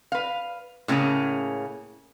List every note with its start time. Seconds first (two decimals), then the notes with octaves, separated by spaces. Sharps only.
0.12 B4 F5
0.88 A2 C#3 A#3 C#4 G#4